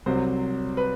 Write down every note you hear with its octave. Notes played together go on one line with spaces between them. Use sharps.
C2 C3 F#3 C5
B4